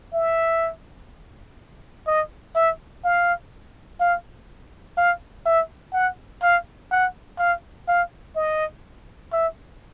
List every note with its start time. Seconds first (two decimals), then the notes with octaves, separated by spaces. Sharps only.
0.13 E5
2.07 D#5
2.55 E5
3.04 F5
4.00 F5
4.97 F5
5.46 E5
5.94 F#5
6.42 F5
6.91 F#5
7.39 F5
7.88 F5
8.36 D#5
9.33 E5